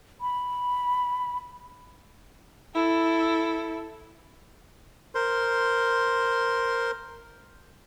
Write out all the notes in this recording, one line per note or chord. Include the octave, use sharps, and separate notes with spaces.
B5
E4 A4
A#4 C5 C6